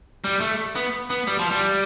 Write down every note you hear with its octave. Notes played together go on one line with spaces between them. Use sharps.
G3
A3
B3
B3
G3
F3
G3